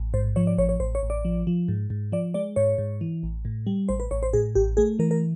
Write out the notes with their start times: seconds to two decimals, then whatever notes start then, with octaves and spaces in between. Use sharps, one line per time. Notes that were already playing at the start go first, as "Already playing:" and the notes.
Already playing: A1
0.14 G#2 C5
0.36 F3 C#5
0.47 D5
0.58 A1 C#5
0.69 C#5
0.80 A1 C5
0.95 C#5
1.03 A1
1.10 D5
1.25 F3
1.47 F3
1.68 G#2
1.90 G#2
2.12 F3 D5
2.34 G#3 D5
2.56 G#2 C#5
2.78 G#2
3.01 E3
3.23 A1
3.45 A2
3.67 G3
3.89 A1 C5
4.00 B4
4.11 A1 C#5
4.23 C5
4.33 A2 G#4
4.55 A1 G4
4.77 A3 G#4
4.99 E3 A#4
5.11 A#4